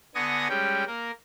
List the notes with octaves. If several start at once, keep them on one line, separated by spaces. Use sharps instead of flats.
D3 B3 G#5 C#6 D#6 A#6
G3 G#3 C#4 G5
A#3 A#4